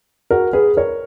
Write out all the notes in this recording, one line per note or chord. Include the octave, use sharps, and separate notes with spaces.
F#4 A#4
G#4 B4
A#4 C#5